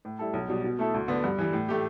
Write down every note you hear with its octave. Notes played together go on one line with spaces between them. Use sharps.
A2
G3 E4 A4
B1
B2 G3
B2
A3 E4 A4
D2
D3 B3
G2
E3 G3
A2
A3 G4